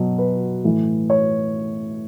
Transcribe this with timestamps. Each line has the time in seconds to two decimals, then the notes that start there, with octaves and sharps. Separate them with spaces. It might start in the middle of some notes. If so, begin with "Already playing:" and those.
Already playing: B2 F#3
0.18 B4
0.64 A2 E3
1.10 C#5